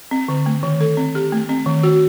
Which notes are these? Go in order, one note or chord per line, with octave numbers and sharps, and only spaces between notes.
C4
D3
A3
D#3
A4
C4
G4
A3
C4
D#3
F#4